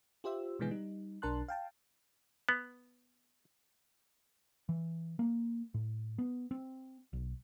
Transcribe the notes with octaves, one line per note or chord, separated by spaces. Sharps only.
F4 G4 C5 E5 E6
B2 D3 E3 G#3 B3 G#4
G3 D#4
B1 D4 A#4 A5 C6 F#6
F5 G5 A5
B3
E3
A#3
A2
B3
C4
B1